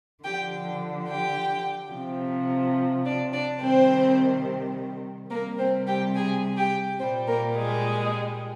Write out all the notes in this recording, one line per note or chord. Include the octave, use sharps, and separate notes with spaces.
D3 F3 G4 G5
G4 G5
C3 F3
D4 D5
D4 D5
C3 D#3 G3 C4 C5
C3 G3 A#3 A#4
C4 C5
G4 G5
G#4 G#5
G4 G5
A#2 G3 C4 C5
A#3 A#4
G#3 G#4